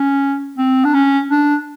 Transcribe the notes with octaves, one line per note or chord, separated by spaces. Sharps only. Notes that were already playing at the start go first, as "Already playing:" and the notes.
Already playing: C#4
C4
D4
C#4
D4